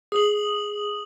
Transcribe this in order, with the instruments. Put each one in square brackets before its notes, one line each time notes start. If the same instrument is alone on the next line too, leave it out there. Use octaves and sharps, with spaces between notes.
[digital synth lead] G#4 [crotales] D#6 F#7